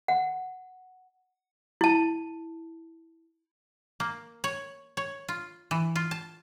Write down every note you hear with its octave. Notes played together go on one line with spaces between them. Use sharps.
F#5
E4 A5
A#3
C#5
C#5
F4
E3
F4
A5